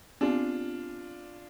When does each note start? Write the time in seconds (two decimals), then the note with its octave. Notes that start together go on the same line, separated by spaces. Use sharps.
0.21 B3 C4 D4 F4 G4